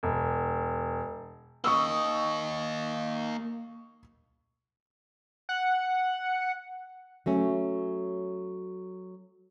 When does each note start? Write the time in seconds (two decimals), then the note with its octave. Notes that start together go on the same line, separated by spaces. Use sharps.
0.03 E1
1.64 A#3 D#5 C#6 D#6 E6
5.49 F#5
7.26 F#3 A3 C#4